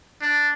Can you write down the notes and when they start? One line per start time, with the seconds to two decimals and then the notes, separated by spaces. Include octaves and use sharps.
0.22 D4